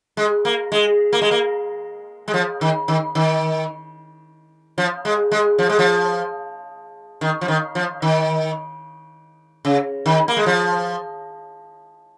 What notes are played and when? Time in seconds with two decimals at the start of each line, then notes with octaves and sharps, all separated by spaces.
0.17 G#3
0.45 A#3
0.72 G#3
1.13 A#3
1.22 G#3
1.31 A#3
2.28 G#3
2.34 F3
2.61 D#3
2.88 D#3
3.15 D#3
4.78 F3
5.05 G#3
5.32 G#3
5.58 F3
5.69 G#3
5.79 F3
7.21 D#3
7.41 F3
7.48 D#3
7.75 F3
8.02 D#3
9.65 C#3
10.06 D#3
10.28 A#3
10.37 G#3
10.46 F3